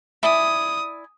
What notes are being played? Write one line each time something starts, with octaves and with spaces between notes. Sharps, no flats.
E4 D5 G#5 D#6